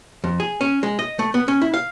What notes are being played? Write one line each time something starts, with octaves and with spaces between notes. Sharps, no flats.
F2
G#4
C#4
G#3
D#5
A3
B3
C#4
E4
F5